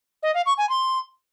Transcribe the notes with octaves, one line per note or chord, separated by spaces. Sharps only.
D#5
F5
C#6
G#5
C6